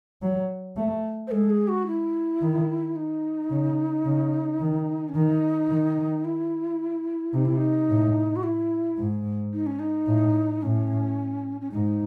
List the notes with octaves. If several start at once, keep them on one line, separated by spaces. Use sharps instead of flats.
F#3
A3
C5
G#3 A4
G#4
F#4
E4
D#3
D#4
C#3
C#3
D#3
C#4
D#3 D#4
D#3
E4
C3 D#4
E4
D#4
A2
F#4
E4
G#2
D#4
C#4
D#4
A2
A2 C#4
C#4
G#2 D#4